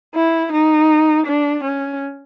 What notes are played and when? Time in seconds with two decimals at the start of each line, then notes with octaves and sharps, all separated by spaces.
0.15 E4
0.52 D#4
1.26 D4
1.64 C#4